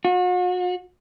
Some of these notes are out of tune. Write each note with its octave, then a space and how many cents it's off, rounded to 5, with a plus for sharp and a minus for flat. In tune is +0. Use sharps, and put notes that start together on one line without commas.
F#4 -40